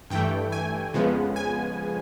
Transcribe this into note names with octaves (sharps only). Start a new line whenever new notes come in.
G2 E3 A3 G5
G#5
F2 C#3 F3 G#3 B3
G#5